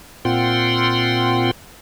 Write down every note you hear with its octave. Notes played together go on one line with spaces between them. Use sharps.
A#2 C4 F4 F#5 G5 C6